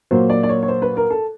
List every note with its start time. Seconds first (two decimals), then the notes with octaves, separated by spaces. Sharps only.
0.11 A#2 F#3 A#3 C5
0.30 D5
0.43 D5
0.49 C#5
0.63 C#5
0.68 C5
0.82 B4
0.97 A#4
1.10 A4